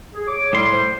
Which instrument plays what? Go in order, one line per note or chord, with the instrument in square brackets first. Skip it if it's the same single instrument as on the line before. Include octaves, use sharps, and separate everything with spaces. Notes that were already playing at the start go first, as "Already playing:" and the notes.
[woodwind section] G#4
C#5 D6
[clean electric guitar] A2 C6 [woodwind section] G3
[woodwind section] C5